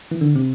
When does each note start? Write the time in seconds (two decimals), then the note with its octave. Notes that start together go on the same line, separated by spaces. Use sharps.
0.11 E3
0.21 D3
0.35 C3